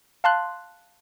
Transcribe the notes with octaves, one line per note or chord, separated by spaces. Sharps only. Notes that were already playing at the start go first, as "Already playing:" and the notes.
F5 A5 C6 F#6